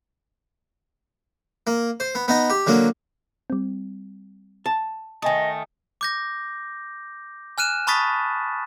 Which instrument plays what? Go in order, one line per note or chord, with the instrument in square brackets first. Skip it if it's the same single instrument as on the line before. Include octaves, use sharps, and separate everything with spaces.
[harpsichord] A#3
C5
B3
B3 D#4 D#5
G4
D3 F#3 A#3
[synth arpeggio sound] G3 C4
[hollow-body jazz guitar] A5
[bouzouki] D#3 A3 [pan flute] D#5 [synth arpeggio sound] G#5 D#6
[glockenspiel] D6 G6 A#6
G#5 F6 F#6 D#7 E7
A5 B5 C#6 D#6 A6 B6